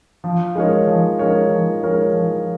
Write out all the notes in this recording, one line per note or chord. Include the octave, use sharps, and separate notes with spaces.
F3
G#3 D#4 A#4 C#5
F3
G#3 D#4 A#4 C#5
F3
G#3 D#4 A#4 C#5
F3